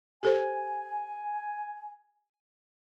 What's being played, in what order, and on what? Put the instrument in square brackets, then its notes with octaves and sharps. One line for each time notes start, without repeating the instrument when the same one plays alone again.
[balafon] G4 A4 C5 [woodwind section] G#5